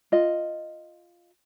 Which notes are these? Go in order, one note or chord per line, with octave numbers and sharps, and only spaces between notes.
F4 D#5